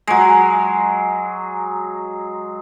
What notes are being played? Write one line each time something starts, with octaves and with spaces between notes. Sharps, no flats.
F#3 G#3